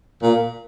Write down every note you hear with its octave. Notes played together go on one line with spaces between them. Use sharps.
A#2